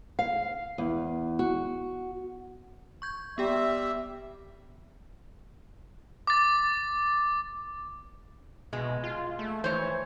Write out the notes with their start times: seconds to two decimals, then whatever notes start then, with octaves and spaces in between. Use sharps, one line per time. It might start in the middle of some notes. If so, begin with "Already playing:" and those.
0.19 F5
0.78 E2
1.39 F#4
3.02 C#6 G6 G#6
3.38 G3 B3 G4 E5 G5
6.27 D6 A6
8.73 B2 G#3
9.04 F4
9.39 A3
9.64 E3 C5 C#5